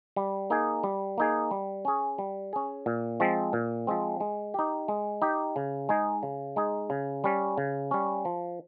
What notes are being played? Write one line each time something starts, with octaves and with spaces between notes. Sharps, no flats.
G3
A#3 D#4 G#4
G3
A#3 D#4 G#4
G3
C#4 G#4
G3
C#4 G#4
A#2
F3 G#3 C4
A#2
F3 G#3 C4
G#3
D#4 G4
G#3
D#4 G4
C#3
G#3 D#4 G#4
C#3
G#3 D#4 G#4
C#3
G3 C#4
C#3
G3 C#4
F3